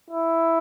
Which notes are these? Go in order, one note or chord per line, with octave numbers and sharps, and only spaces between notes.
E4